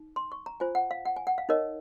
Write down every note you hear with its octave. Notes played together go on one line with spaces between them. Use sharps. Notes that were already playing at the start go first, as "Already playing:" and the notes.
Already playing: D#4
C6
C#6
A#5
F4 C5 G#5
F#5
F5
F#5
G#5
F#5
F5
D#4 A#4 C#5 D#5